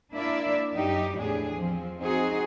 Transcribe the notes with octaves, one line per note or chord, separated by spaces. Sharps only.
A#3 D4 E4 D5 E5
F#2 D#4 G4
E2 A2 D4 G#4
F3 C4
C4 D#4 F#4 G#4